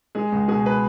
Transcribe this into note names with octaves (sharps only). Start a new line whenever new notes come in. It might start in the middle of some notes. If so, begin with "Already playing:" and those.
G#3 G#4
C#2
B2 G#4
B4